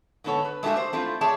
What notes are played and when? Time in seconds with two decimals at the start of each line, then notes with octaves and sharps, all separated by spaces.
0.24 G#2 D3 B3 A4 C#5
0.45 B4
0.63 G#3 A3 D4 F#4 G4 E5
0.76 D4 C5
0.93 A3 C4 E4 F4
1.21 G#4 C#5 D5 E5 A5